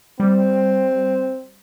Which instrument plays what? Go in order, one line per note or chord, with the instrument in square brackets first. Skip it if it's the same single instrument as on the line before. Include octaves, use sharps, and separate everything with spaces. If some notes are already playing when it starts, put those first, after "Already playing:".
[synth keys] G3 [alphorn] C4